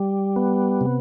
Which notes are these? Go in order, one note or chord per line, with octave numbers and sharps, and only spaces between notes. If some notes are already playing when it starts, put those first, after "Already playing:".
Already playing: G3
B3
C3